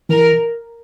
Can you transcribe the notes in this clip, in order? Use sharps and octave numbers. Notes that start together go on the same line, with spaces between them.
E3 A#4